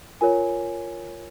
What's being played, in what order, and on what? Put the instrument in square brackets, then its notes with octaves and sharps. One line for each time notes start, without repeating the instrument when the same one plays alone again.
[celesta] F4 A#4 C#5 G#5